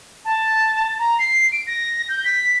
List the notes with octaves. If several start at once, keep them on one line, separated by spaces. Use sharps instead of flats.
A5
A#5
C7
D7
A#6
G6
B6